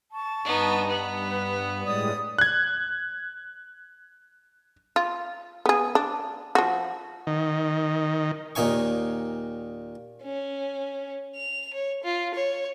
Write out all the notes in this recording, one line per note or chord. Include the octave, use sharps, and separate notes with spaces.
A5 C#6
G2 B3 D#4
B3 B4
A2 G3 G#3 C#5 D5 D#6
F#6 G#6
F4
B3 G#4
D4
F3 F#4
D#3
D#2 A#2 D#4 G#5 C#6
C#4
F7
C#5
F4
C#5